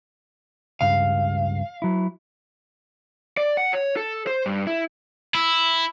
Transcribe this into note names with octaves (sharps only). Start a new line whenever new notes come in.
C#2 G2 F5
F#3 E4
D5
F#5
C#5
A4
C5
G2
E4
E4